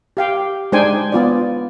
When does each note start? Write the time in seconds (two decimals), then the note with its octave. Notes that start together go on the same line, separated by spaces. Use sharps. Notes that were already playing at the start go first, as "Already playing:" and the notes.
0.17 G4 F5 G5
0.72 G#3 D4 D#4 C5 G5 G#5
1.12 B3 F4 D5